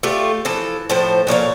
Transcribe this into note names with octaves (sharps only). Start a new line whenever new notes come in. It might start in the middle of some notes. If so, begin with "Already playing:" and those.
A3 F4 G4
E3 F3 A4
A2 F3 C5
A#2 F3 C#5 F5